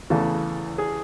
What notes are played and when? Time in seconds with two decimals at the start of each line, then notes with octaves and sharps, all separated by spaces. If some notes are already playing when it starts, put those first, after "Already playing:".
0.10 E2 C#3 E3 A3 A4
0.78 G#4